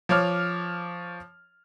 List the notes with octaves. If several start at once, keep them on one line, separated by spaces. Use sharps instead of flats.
F3 C#5 D6 F6